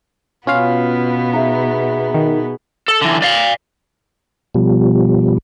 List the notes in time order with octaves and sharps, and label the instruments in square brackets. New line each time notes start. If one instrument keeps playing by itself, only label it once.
[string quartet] B2 B3 [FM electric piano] C#4 F4 F5
[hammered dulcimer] D#4 G#4 E5
[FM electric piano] D#3
[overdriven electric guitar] A4
D3 E3
D5 F5
[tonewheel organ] B2 F3 G3